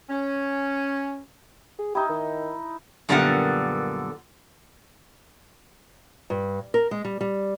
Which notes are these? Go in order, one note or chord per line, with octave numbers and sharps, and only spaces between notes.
C#4
G#4
D#4 E4 G4
D#3
F#2 A#2 D3 G3 B3 F#5
G2
A#4
G#3
G3
G3